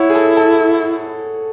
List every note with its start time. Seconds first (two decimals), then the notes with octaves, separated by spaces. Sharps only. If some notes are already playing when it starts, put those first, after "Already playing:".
Already playing: E4 C#5 F#5
0.10 G#4
0.15 A4
0.37 A4